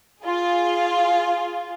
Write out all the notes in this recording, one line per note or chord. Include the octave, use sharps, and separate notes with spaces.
F4 G#4